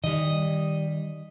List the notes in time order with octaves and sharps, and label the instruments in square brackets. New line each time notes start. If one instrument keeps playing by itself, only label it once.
[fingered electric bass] D#3 [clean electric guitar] G3 D#5